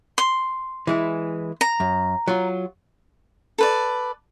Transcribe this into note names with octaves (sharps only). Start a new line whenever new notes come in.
C6
E3 G#3 E4
A#5
F#2
F#3 F4
A4 B4 D5